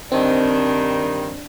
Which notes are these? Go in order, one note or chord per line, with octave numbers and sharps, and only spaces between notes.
G2 D#3 C4 D4